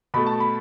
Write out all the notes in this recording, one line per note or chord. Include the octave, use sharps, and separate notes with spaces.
B2 A3 B5
A5
B5